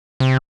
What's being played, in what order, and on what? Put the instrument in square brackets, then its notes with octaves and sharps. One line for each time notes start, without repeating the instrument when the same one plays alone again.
[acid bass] C3